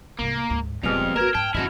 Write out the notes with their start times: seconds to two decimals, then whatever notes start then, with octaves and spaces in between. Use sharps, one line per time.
0.19 C2 G#2 A#3
0.50 D2 G#2
0.84 E1 F2 A#2 G3 G#3 B3 F6 F7
1.16 G#1 A3 B3 F#4 A#4 F6 G#6 E7
1.35 G#2 G5 A5
1.55 G#2 B2 D#3 C#4 E4 F#4